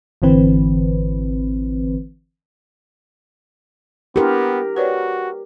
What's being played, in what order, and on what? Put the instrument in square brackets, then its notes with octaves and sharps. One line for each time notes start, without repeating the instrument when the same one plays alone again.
[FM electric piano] G#1 D3 E3 C4 B4
[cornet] B3 [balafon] D4 E4 [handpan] G4 A#4
[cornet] F#4 [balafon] B4 C#5 D5